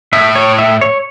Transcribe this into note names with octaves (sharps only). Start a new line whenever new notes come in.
A2 E5
C#5
E5
C#5